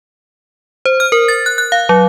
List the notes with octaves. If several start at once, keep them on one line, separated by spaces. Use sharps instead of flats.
C5
F6
A#4
A6
F#6
F#6
F5
F#3